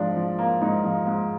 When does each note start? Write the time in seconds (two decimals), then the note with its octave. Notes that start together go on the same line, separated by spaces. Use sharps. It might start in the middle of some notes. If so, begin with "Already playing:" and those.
Already playing: G#2 F3 D4
0.16 F3
0.38 A#3
0.61 G#2 D#4
0.84 F3
1.07 G#2